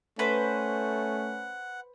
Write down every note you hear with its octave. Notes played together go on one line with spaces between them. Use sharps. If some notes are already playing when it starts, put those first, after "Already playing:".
A3 C#4 B4 C5 F#5